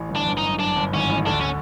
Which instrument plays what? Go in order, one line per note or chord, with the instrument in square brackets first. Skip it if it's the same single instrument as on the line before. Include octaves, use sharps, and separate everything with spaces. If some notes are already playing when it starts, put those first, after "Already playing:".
Already playing: [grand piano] A1 A2
G1 G2
[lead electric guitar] D4
[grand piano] G1 G2
[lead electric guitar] D#4
[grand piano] F#2
[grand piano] F#2 [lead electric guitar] D4
[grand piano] G1 G2
[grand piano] G#1 G#2 [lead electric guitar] C#4
[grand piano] A1 A2
[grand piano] D2 D3 [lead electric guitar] D4
[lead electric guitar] C#4